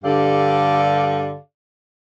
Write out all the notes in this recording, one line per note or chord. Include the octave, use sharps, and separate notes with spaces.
G2 D3 G4 A4 D5 F5